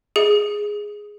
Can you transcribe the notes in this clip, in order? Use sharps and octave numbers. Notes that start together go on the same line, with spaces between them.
G#4